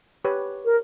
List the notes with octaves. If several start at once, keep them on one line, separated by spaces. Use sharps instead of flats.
G4 B4 C#5
A#4